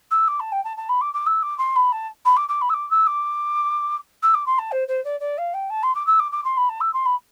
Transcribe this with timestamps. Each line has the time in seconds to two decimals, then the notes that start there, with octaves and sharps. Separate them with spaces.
0.11 E6
0.28 D6
0.40 A5
0.52 G5
0.64 A5
0.77 A5
0.89 B5
1.01 D6
1.14 D6
1.26 E6
1.42 D6
1.58 C6
1.76 B5
1.92 A5
2.25 B5
2.36 D6
2.49 D6
2.61 B5
2.69 E6
2.74 D6
2.90 E6
3.07 D6
4.23 E6
4.34 D6
4.46 C6
4.58 A5
4.72 C5
4.88 C5
5.04 D5
5.20 D5
5.38 F5
5.54 G5
5.70 A5
5.83 C6
5.95 D6
6.06 E6
6.19 D6
6.32 D6
6.44 C6
6.57 B5
6.69 A5
6.80 E6
6.93 C6
7.05 B5